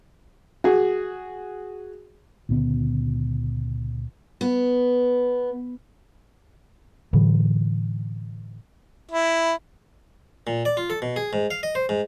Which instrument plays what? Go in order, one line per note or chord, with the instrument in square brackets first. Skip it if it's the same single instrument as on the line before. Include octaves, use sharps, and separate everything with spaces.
[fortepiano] F#4 G#4
[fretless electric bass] C#2 A#2 D3 B3
[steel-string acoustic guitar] B3
[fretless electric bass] A2 D3 E3 F#3
[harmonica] E4
[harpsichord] A#2
D5
F4
A4
B2
G#4
G#2
F5
D#5
C5
G#2